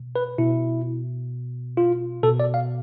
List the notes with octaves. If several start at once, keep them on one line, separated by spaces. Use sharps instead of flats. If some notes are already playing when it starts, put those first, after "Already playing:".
Already playing: B2
B4
B2 E4
F4
B2 A4
D5
F5